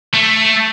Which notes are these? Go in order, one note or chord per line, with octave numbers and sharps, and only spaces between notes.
A3